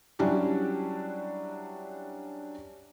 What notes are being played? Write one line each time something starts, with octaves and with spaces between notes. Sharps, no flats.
F#3 G3 C#4 D4 E4 G4